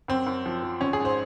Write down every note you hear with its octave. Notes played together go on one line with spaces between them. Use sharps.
F#2 C4
F#2
F3
F3
G#1 C#4
G#4
G#2
C5